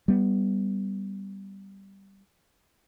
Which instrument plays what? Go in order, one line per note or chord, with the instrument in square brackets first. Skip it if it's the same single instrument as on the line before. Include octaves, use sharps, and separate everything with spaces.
[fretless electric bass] G3 B3